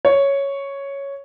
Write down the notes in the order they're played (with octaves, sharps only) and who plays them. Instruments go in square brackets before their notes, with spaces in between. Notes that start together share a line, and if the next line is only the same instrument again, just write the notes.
[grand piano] C#5